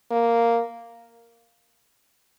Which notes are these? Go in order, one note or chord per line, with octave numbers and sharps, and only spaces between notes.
A#3